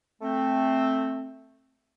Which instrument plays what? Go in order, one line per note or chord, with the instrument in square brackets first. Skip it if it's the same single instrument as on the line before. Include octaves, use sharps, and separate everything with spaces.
[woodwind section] A3 C4